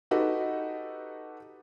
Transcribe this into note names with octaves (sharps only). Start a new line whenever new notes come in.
D#4 F#4 G4 A4 B4 D#5